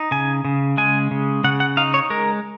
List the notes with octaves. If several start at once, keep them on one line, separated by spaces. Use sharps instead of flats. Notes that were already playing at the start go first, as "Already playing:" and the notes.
Already playing: D#4
C#3 G#5
C#3
G#3 G#5
C#3
C#3 F#5
F#5
D#4 F5
C#5
G#3 A#4